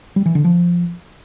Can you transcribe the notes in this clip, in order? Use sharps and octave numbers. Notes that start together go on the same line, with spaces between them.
G3
E3
D3
F3